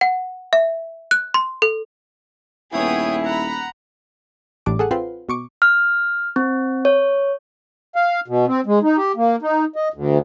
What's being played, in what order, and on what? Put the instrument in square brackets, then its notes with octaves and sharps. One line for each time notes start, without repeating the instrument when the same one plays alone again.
[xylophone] F#5
E5
F#6
C6
A4
[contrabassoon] D#1 [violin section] B3 C#5 D#6 [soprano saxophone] E4 [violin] G#4 G5
[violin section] F#5 B5 [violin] A#5
[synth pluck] A1 A2 G3 D4 D6
G#4 A4 F#5
C4 F4 B4 C6
B2 C#6 D6
[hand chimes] F6
C4
C#5
[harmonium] F5
B2
C4
G#3
D#4
G4
A#3
D#4
D#5
D2